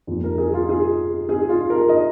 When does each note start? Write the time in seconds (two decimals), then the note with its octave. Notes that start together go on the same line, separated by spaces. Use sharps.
0.07 F2 F3 A#3
0.24 A#4
0.38 G#4
0.54 F4
0.69 G#4
1.29 G#4
1.49 F4
1.70 A#4
1.89 D#5